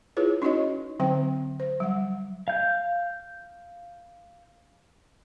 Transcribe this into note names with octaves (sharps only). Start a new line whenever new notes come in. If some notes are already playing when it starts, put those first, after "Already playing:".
E4 F4 G#4 B4 C#5
C#4 D#4 E4 F#4 C#5 D#5
D3 F#3 C4 C5 G5
C5
F#3 G3 F#5
F5 G6